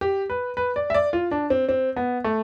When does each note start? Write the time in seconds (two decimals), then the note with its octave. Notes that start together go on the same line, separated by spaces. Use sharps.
0.01 G4
0.30 B4
0.57 B4
0.76 D5
0.90 E5
0.94 D5
1.13 F4
1.31 D4
1.50 C4
1.69 C4
1.96 B3
2.24 A3